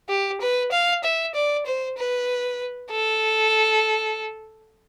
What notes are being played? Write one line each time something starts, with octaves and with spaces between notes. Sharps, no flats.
G4
B4
F5
E5
D5
C5
B4
A4